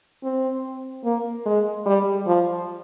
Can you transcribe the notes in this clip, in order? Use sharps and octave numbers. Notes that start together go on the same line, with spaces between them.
C4
A#3
G#3
G3
F3